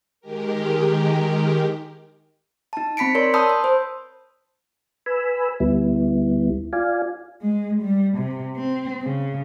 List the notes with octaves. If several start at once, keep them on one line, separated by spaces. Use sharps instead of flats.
D#3 G#3 G4 A#4
D#4 A5
C4 B5 B6 C#7 D7
A#4 C#5 D5 C6
A5 B5 C6 D#6 E6 G6
C6
C5
B4 G#5 B5 E6
D2 G3 B3 E4
F4 D5 F5 G#5
G#3
G3
C3
C4
C#3